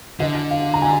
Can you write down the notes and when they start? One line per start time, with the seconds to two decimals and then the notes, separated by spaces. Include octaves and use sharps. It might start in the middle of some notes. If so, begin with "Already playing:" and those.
0.20 D3 D#5
0.51 F5
0.74 A#5
0.82 G#5